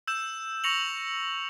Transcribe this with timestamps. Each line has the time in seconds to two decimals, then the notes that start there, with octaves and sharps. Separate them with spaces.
0.07 E6 G6 E7
0.64 C#6 A#6 C#7 F7 F#7